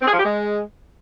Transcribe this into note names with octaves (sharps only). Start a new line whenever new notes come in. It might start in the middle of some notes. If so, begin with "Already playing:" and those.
C4
G#4
F3
G4
G#3